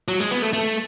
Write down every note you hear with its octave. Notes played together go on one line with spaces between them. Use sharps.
F#3
G#3
B3
A3
A3